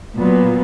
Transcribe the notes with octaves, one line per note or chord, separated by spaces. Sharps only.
A#2 F#3 B3